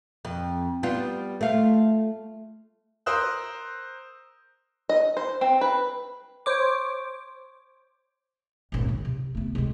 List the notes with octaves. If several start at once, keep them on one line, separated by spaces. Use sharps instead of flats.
F2
G3 B3 F4
A3 F4
A#4 C5 D#6 E6 F#6
D#5
C5
C4
B4
C5 C#5 D6
D#1 G#1
C#3 G3
C3
A3 B3
C3 G#3